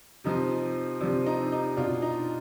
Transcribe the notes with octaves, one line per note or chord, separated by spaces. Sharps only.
C3 F3 D#4
C3 F3 D4
D#4
D#4
B2 D4 F4
D#4